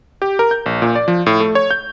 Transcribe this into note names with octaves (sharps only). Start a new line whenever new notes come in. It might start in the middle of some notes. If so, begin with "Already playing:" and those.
G4
A#4
G6
A#1
A#2
D5
F3
A2
A3
C#5
G6